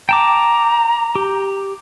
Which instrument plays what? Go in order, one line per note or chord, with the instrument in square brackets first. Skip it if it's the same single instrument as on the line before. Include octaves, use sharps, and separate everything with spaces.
[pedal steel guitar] G5 A5 D6 [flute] A#5
[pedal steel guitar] G4